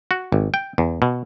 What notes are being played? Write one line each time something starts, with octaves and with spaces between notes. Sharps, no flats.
F#4
G#1
G5
E2
B2